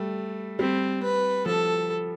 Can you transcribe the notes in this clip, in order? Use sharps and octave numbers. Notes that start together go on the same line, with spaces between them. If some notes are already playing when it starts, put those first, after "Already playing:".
Already playing: G3 A3
G3 C4
B4
F3 A4